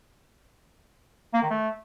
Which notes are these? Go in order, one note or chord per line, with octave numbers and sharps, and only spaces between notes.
A#3
D#3
A3